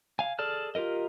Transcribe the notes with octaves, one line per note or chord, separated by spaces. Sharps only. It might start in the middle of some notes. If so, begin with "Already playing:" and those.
F5 G#5
G#4 A4 D5 A5 F6
F4 G4 A#4 D#5